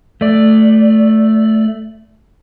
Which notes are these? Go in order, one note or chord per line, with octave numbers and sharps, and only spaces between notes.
A3 D5